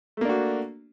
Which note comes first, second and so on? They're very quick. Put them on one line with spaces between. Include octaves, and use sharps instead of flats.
A3 A#3 D4 F#4